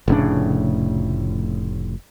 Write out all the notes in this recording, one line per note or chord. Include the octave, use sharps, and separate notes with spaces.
F1 A2 C#3 D4